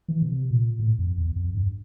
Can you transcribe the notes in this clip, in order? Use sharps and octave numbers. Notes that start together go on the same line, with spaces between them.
E3
C3
A#2
A2
F2
E2
F2
G2